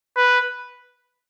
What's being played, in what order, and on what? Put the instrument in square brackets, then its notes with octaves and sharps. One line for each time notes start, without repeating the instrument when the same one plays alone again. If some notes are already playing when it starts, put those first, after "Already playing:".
[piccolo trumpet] B4